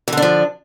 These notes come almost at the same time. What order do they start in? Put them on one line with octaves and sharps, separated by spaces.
E3 D3 D4 F3